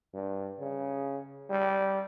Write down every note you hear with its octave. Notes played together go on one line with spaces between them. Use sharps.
G2
C#3
G3